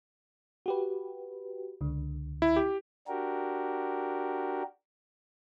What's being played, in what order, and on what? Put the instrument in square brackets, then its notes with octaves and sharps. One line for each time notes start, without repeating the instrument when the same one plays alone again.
[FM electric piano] F#4 G4 B4
C#2 D3
[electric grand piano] E4
G4
[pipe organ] D4 F#4 G4 A#4